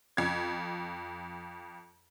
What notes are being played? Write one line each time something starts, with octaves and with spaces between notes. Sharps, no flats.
F2 G#6